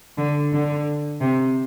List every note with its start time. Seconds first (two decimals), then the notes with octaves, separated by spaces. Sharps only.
0.18 D3
0.53 D3
1.21 C3